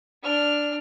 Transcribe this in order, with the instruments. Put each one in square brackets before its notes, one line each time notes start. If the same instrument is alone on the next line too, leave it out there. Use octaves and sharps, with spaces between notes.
[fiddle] D4 F6